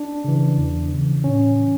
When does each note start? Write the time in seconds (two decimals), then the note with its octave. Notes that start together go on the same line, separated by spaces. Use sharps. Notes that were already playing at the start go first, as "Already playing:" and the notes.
Already playing: D4
0.24 C#3 E3
0.58 E2
0.91 C#3 E3
1.24 A2 C#4
1.58 E3